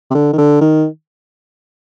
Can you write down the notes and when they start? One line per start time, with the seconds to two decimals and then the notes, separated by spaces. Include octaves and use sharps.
0.11 C3
0.14 D3
0.33 D#3
0.38 D3
0.61 D#3